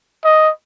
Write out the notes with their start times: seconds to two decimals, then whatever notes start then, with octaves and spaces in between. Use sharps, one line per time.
0.25 D#5